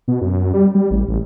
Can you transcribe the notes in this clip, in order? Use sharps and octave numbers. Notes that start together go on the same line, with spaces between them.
B2
F#2
G3
G3
A1
A1